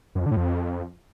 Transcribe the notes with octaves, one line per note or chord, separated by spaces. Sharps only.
F#2
F2
D3
A2
F2